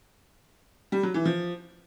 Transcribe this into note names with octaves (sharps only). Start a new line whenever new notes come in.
G3
F#3
E3
F3